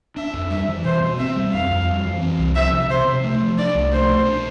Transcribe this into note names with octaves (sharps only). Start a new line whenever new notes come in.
D4 E5
F2
G3 E5
E3
B2 C5
B2
C4 E5
G3
F2 F5
F2
G3
E3
C4
C2
F3 E5
C3
C3 C5
C3
A3
F3
D4 D5
C2
A3 C5
B2
D4